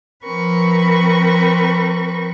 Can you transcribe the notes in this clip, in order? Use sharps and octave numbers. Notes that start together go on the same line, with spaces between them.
F3 C4 A#4 B4 B5 C#6